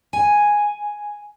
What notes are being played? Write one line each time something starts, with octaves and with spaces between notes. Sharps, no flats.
G#5